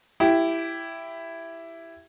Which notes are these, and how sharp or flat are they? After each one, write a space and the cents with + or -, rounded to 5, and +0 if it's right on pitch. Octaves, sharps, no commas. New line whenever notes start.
E4 +10 G4 +0